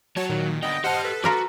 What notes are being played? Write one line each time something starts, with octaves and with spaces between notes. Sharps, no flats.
F#3 F#4 C#5 A5
A#2 D#3
D3 B3 D#5 G5
G4 C5 D#5 F#5 A5 F6
A4 B4
F4 F#4 A#4 D5